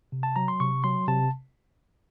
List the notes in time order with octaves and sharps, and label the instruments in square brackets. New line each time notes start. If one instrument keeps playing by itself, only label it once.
[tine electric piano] C3
A5
F#3 A#5
C6
C3 C#6
F#3 C6
C3 A5